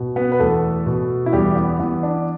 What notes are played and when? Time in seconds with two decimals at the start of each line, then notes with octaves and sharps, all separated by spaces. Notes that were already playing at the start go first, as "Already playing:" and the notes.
Already playing: B2
0.16 B3 B4
0.32 B4
0.40 E2 A3 A4
0.86 B2
1.26 E4
1.33 E2 G3 G4
1.56 B3
1.80 E3 B3
2.03 D4